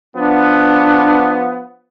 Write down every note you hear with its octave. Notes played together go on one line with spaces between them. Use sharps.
F3 B3 D4